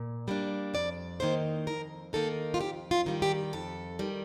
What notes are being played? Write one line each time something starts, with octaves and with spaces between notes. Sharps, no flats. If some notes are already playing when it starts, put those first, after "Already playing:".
Already playing: A#2
G3 A#3 D4
F2 D5
D#3 A#3 D#4 C5
F2 A#4
D#3 A#3 D#4 A4
F4
F2 G4
F4
D#3 G3
G4
F2 A4
D#3 G3